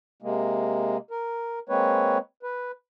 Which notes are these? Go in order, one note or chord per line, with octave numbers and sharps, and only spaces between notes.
C3 G#3 A#3
A#4
G#3 A#3 C4 B4 C#5
B4